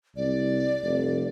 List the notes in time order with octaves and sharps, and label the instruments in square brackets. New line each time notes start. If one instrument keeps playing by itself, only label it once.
[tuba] C2 [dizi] D5
[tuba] F1